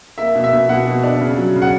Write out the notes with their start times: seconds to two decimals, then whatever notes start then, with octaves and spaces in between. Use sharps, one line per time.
0.18 A#3 E5
0.35 B2
0.44 E5
0.53 B2
0.69 B2 F#5
0.87 B2
1.04 D4
1.21 C#3
1.38 F#3
1.56 C#3
1.62 F#5